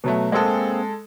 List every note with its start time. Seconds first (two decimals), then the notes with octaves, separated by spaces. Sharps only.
0.04 B2 F#3 A3
0.32 G#3 A#3 C4 G#4 A4